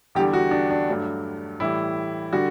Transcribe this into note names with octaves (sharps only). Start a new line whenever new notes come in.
E2 D3 G3 G4
F#4
D4
D4
G2 F#3 A3
A2 E3 G3 E4
D3 G3 F#4